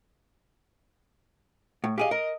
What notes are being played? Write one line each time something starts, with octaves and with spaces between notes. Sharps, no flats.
A2
G4 G#4 D#5 F5
A#4 D#5